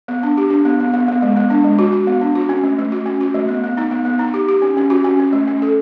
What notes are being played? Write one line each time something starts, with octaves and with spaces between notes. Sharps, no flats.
B3
D4
G4
D4
B3
B3
B3
B3
G#3
B3
D4
G#3
F#4
F#4
B3
D4
F#4
C#4
A3
A3
F#4
C#4
F#4
A3
B3
B3
D#4
B3
B3
D#4
G4
G4
C#4
C#4
F#4
C#4
C#4
A3
C#4
A4